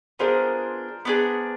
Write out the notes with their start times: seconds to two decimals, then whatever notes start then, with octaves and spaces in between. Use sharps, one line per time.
0.19 B3 D4 F4 G#4 A#4 C5
1.05 B3 D4 F4 G#4